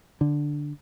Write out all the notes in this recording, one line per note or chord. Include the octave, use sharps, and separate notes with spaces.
D3